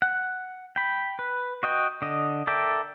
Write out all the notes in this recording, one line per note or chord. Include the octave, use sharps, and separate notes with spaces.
F#5
G5 B5
B4
F#4 D#5 G5
D3 D#5
A4 A#4 D5 E5 G5